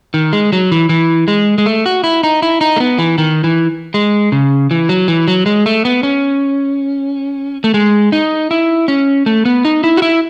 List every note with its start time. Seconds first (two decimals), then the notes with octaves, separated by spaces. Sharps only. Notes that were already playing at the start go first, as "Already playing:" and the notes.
0.14 D#3
0.33 G#3
0.53 F#3
0.72 E3
0.89 E3
1.28 G#3
1.58 G#3
1.66 A3
1.86 F#4
2.04 E4
2.23 D#4
2.42 E4
2.61 D#4
2.76 A3
2.80 B3
2.99 E3
3.18 D#3
3.44 E3
3.94 G#3
4.32 C#3
4.71 E3
4.89 F#3
5.08 E3
5.28 F#3
5.46 G#3
5.66 A3
5.85 B3
6.03 C#4
7.64 A3
7.74 G#3
8.12 D#4
8.51 E4
8.88 C#4
9.26 A3
9.45 B3
9.65 D#4
9.84 E4
9.97 F#4
10.02 E4